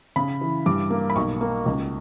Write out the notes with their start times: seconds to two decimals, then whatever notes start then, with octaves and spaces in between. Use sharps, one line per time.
0.16 C#3 B5
0.41 E3
0.66 G2 D6
0.90 A#3
1.10 B5
1.16 B1 C#6
1.41 A#3
1.66 C#2